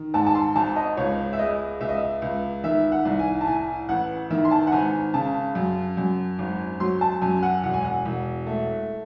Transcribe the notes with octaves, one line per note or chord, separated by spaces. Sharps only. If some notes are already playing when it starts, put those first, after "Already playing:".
Already playing: D#3
G#2 A5
A5
C6
G#1 A5
D#5
C#2 C#5
E5
G#3 D#5
C#2 E5
D#5
E5
C#2
D#3 E5
F#5
C2
G#5
A5
A2 G#5
A1 F#5
D#3 E5
C6
A5
F#5
G#1 G#5
C#3 A5
F#2
F#2
G#1
F#3 C6
A5
F#2 G#5
G#5
F#5
E1 F#5
G#5
F#5
E1
A3